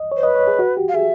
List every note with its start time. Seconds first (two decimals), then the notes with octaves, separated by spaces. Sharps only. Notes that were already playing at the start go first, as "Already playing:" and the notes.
Already playing: D#5
0.12 C#5
0.17 C5
0.23 B4 D#5
0.35 C#5
0.47 G#4
0.59 F#4
0.77 G4
0.89 F5
0.94 G#4 E5